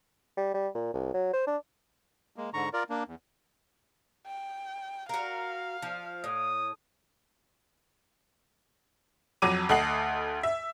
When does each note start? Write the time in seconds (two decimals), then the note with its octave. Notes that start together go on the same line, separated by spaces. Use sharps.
0.37 G3
0.54 G3
0.75 A#2
0.94 C2
1.14 F#3
1.33 C5
1.47 D4
2.36 G#3 A#3
2.54 G#2 D3 A#5 C#6
2.73 F4 A#4 D5
2.90 A#3 D4
3.08 E2
4.26 G5
5.09 F#4 A#4 F5
5.82 F3
6.24 A2 D#6
9.42 F2 F#3 D6 D#7
9.69 D2 A4 D#5 F#5 C7 F#7
10.43 E5